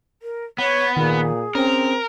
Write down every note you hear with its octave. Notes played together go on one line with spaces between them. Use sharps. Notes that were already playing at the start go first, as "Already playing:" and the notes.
A#4
B3 C#5
A#2 D#3 G#4
C4 C#4 A#4